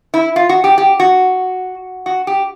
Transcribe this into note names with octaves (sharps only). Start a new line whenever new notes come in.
E4
F4
F#4
G4
G4
F#4
F#4
G4